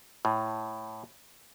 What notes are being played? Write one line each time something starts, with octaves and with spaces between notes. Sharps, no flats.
A2